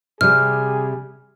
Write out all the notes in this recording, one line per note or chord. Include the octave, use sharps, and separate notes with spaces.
C3 G3 G#4 F6